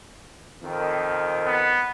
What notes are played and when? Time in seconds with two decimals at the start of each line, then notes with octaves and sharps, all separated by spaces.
0.63 F2 D#3
1.46 B3